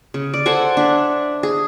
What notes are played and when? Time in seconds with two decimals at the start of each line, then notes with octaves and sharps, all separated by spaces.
0.14 C#3
0.34 D5
0.46 A4 C5 F#5 G#5
0.77 D4 E5
1.43 G#4